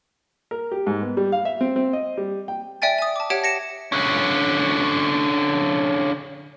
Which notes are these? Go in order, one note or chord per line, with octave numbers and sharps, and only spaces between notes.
A#4
G4
G#2
B3
G3
F5
E5
C4
C4
D#5
G3
G5
D5 E5 G5 G#5 A6
G#5 D#6
A5 D6
G4 C#5 E5 F#5 A5 D7
A#6 C#7 E7
D3 C#4